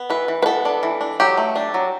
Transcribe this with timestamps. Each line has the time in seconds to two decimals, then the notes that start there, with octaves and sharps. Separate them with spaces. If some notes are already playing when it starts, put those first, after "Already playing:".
Already playing: B3
0.10 E3 B4
0.28 E3
0.42 B4
0.46 B3 A4
0.65 D4
0.83 E3
1.01 D4
1.20 F#3 G4
1.37 A3
1.56 D4
1.74 F#3